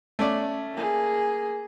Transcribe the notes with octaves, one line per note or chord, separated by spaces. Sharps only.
A3 C#4 D5
A#3 G#4